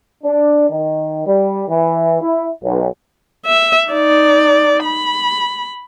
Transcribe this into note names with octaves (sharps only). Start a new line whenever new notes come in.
D4
D#3
G3
E3
E4
B1
E5
D#4 D5
B5